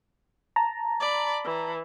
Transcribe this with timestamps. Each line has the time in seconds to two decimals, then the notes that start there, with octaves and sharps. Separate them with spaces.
0.56 A5 A#5
1.00 D5 B5
1.45 E3